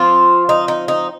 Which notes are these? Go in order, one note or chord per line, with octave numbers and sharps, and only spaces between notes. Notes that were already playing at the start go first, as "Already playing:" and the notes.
Already playing: F3 C4 F4
D#4
D#4
D#4